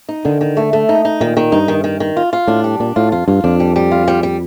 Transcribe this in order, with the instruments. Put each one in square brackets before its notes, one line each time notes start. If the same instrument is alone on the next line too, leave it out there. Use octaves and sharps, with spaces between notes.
[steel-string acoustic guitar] D#4
[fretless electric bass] D3 [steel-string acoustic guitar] D#3
[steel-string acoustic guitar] D#3
A3
A3
D#4
D#4
[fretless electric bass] A#2 [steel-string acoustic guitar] D#3
[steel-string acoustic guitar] D#3
[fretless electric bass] G2 [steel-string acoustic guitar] D#4
[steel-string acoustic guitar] D#3
D#3
D#3
F4
F4
[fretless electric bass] A2 [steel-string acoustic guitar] D4
[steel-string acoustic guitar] G3
[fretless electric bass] A#2 [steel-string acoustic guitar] D4
[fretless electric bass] A2 [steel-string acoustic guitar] F4
[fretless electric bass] F2 [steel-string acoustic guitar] F4
[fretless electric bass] G2 [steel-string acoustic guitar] F4
[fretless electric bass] F2 [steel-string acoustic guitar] D4
[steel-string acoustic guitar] G3
G3
F4
G3
G3